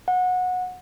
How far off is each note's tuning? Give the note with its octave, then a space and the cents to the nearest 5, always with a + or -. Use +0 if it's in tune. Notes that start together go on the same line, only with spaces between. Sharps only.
F#5 -20